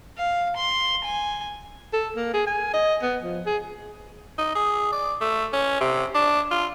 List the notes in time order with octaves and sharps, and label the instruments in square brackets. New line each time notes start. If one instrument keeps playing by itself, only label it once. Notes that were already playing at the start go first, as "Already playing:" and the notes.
[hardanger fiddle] F5
C6
G#5
[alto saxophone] A4
A#3
G#4
G#5
D#5
B3
F3
G#4
[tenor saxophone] D#4
G#4
D5
A3
C#4
C3
D4
F4